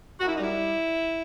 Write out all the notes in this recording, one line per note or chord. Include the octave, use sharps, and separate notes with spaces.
F#2 F#4
E4
D#4
G3 E4